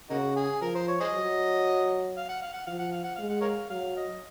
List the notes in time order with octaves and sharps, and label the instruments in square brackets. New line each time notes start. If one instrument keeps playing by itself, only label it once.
[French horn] C#3 [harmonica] A#3 D#4 F#4
[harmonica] G#4
[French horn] F3 [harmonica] A#4
[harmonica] C5
C#5
G#4 C5 D#5
[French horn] F#3
[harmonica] F5
F#5
F5
F#5
[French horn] F3 [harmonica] F5
[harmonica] F#5
F5
F#5
[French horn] G#3 [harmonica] F5
[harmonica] F#5
A#4 C#5 F5
[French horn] F#3 [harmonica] F5
[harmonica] D#5